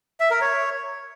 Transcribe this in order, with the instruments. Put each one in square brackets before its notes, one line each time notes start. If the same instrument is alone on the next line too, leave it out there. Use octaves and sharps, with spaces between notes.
[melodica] E5
A#4
C#5